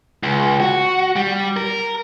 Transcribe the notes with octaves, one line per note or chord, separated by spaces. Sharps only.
C#2
F#4
G3
A#4